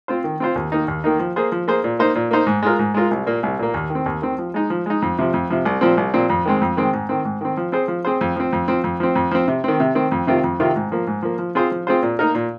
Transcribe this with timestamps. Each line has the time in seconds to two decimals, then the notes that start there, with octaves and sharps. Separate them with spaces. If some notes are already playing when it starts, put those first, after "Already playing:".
0.08 C4 F4 C5
0.24 D#3
0.40 C4 F4 C5
0.56 D#2
0.72 D#3 A#3 D#4
0.88 D#2
1.04 D#3 A#3 D#4
1.19 F3
1.36 A#3 G#4 C5
1.52 F3
1.68 A#3 G#4 C5
1.84 A#2
1.99 A#3 D#4 C5
2.15 A#2
2.31 A#3 D#4 C5
2.47 G#2
2.62 G#3 F4 A#4
2.79 G#2
2.94 G#3 F4 A#4
3.11 C2
3.27 A#2 A#3
3.43 C2
3.59 A#2 A#3
3.74 D#2
3.90 D#3
3.95 C4
4.06 D#2
4.22 D#3 C4
4.39 F3
4.54 G#3 D#4
4.70 F3
4.86 G#3 D#4
5.02 F2
5.18 C3 F3
5.34 F2
5.50 C3 F3
5.65 C2
5.81 A#2 F3 C4
5.97 C2
6.14 A#2 F3 C4
6.30 F2
6.45 D#3 G#3 C4
6.62 F2
6.77 D#3 G#3 C4
6.93 G#2
7.09 D#3 C4
7.25 G#2
7.41 D#3 C4
7.57 F3
7.72 C4 G#4 C5
7.88 F3
8.05 C4 G#4 C5
8.21 F2
8.36 F3 C4
8.53 F2
8.68 F3 C4
8.84 F2
9.00 F3 C4
9.15 F2
9.31 F3 C4
9.48 C3
9.64 D#3 C4
9.80 C3
9.95 D#3 C4
10.12 F2
10.27 C3 D#3 C4 F4
10.44 F2
10.60 C3 D#3 C4 F4
10.76 G#2
10.92 F3 A#3
11.07 G#2
11.23 F3 A#3
11.39 F3
11.55 C4 F4 G#4 C5
11.71 F3
11.87 C4 F4 G#4 C5
12.03 A#2
12.19 A#3 D#4 A#4
12.35 A#2